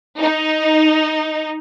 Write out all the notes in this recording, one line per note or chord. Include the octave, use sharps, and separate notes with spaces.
D#4